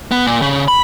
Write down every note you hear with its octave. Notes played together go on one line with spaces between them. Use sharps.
B3
A#2
C#3
B5